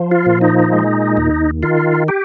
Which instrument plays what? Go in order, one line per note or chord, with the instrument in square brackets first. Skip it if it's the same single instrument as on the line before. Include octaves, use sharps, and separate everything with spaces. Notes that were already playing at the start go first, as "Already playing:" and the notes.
Already playing: [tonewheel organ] F3
F4
A#2
D#4
G#3
D#2
D#3 F4
G4